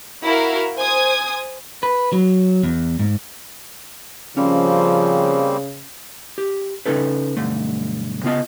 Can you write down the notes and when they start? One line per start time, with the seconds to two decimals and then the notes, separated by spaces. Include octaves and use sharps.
0.24 E4 F#4 A#4 F5
0.77 C5 G#5 D#6 G#6
1.83 B4
2.13 F#3
2.63 E2
2.99 G#2
4.37 C#3 F3 G3 A#3 C4 C#4
6.38 G4
6.86 C#3 C#4 D#4 A4 B4
7.37 B1 G2 D3 A3
8.23 C#3 B3 F4 D#5 A5